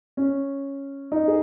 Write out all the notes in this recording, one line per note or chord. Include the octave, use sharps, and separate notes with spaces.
C#4
D#4
G#4